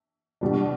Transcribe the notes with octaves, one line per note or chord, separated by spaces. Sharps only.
B2 G3 D4